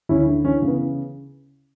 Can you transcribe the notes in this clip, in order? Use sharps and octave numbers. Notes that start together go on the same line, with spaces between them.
D2 C#4 E4
D3
E3 C#4
C#3
B3